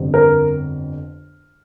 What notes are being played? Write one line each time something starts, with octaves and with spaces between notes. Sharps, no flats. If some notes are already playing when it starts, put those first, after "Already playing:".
Already playing: G1 F2 D3 G3
A#4